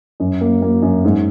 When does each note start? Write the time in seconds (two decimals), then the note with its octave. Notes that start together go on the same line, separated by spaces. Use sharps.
0.20 F#2
0.41 A#3
0.62 A#3
0.82 F#2
1.04 G#2